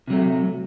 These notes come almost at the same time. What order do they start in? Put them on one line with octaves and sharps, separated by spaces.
C3 F#3 A3